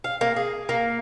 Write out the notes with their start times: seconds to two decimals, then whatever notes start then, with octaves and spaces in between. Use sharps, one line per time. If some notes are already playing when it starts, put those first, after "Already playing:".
0.04 F5
0.21 A#3
0.36 G#4
0.69 A#3